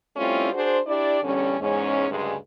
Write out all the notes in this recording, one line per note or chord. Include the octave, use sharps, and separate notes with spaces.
G3 A3 C4 C#4 E4 F4
D4 F#4 G#4 C5
D4 E4 G4 D5
E2 D3 G3 C#4
E2 G#2 G#3 C#4
D2 G2 C#3 G#3